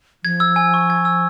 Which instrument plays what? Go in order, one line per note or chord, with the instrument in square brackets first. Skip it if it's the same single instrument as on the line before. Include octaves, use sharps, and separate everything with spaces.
[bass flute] F3 [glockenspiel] G#6
[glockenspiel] E6
G#5
C#6
G#6
E6